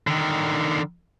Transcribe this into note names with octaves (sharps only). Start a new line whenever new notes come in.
D3 D#3